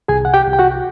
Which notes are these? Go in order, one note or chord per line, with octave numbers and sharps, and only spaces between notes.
C2 G#4 G#5
F#5
G4 G5
C2
G5
F#4 F#5